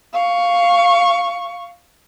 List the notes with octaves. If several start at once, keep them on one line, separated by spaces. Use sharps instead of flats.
F5 C#6